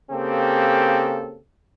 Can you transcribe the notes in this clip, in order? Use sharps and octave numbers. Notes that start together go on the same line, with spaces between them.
C#3 A#3 C4 G4 A4